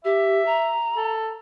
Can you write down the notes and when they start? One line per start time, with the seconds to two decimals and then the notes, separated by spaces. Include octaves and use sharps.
0.05 G4 E5
0.46 A#5
0.96 A4